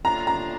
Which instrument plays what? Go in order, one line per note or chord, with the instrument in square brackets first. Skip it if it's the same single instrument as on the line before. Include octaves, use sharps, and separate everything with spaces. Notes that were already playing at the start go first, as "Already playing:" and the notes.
[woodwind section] A2 G3 A#3 D4 F4 [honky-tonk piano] A#5
[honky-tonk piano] A#5